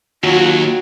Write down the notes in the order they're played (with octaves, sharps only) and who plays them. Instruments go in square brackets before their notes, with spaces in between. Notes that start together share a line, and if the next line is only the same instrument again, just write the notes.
[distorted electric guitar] D#2 [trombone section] F#3 [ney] F4 [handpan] F#4